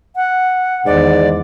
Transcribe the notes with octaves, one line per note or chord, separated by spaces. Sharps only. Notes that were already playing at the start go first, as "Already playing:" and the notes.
F#5
E2 G#2 D#3 D5